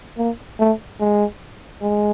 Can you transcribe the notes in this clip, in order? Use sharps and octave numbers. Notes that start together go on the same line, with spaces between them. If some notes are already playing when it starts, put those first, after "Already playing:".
A#3
A3
G#3
G#3